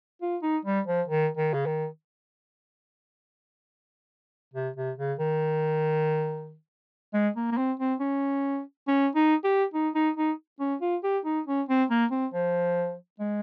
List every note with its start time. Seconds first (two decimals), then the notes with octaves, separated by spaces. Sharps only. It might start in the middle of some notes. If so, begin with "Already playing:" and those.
0.22 F4
0.43 D#4
0.65 G3
0.87 F3
1.08 D#3
1.37 D#3
1.54 C#3
1.66 D#3
4.54 C3
4.77 C3
4.98 C#3
5.19 D#3
7.14 G#3
7.36 A#3
7.52 A#3
7.58 C4
7.80 C4
8.00 C#4
8.88 C#4
9.15 D#4
9.44 G4
9.74 D#4
9.95 D#4
10.17 D#4
10.60 C#4
10.81 F4
11.04 G4
11.25 D#4
11.47 C#4
11.69 C4
11.90 A#3
12.11 C4
12.34 F3
13.20 G#3